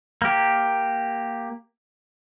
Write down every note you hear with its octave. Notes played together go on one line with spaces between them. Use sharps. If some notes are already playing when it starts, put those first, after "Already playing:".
A#3 G4